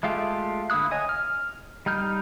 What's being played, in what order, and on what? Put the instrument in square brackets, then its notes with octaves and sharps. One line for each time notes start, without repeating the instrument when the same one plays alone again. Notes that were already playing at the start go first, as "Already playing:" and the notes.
[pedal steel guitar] G#3 A3 F4 G4
D3 A#3 E4 D#6 F#6
C#5 D#5 G#5 D#6
F6
G3 D#4 F6 G6